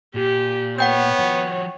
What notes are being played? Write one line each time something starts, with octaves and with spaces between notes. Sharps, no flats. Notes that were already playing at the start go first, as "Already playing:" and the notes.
A#2 G4
B3 C#5 F#5 G5 G6
F3 F#4